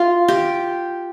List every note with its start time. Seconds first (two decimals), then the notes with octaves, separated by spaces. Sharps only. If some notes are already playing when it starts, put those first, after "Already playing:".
Already playing: F4
0.28 G4